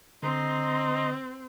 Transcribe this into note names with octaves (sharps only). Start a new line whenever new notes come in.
D3 C4 D#5 A#5 C6